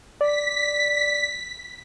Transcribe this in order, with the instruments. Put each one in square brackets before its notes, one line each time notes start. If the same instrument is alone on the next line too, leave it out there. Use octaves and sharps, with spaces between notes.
[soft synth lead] D5 [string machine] B6